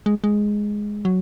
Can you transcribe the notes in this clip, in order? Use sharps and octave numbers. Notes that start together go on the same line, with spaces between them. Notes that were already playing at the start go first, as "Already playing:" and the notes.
G#3
G#3
F#3